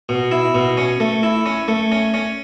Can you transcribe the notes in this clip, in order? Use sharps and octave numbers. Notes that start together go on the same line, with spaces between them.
B2
E4
B2
C#4
A3
E4
C#4
A3
C#4
C#4